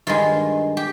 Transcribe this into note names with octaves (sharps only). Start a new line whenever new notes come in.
G2 D#3 G#3 F4
G4